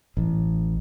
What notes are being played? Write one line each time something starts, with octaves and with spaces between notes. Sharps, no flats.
A1